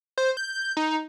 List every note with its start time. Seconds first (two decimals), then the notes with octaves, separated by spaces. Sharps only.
0.18 C5
0.37 G6
0.77 D#4